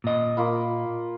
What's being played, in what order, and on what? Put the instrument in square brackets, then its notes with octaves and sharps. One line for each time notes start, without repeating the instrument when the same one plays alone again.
[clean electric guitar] A#2 D#5
[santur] A#3 F4 B5